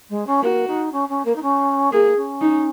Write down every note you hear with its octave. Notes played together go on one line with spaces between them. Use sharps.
G#3
C#4
A#3 F#4
D#4
C#4
C#4
A#3
D#4
C#4
A#3 G#4
C#4
D#4